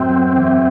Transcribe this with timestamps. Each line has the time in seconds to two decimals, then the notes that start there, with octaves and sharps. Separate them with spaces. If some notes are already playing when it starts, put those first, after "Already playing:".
Already playing: F#2 A2 C4
0.09 F#3
0.35 E2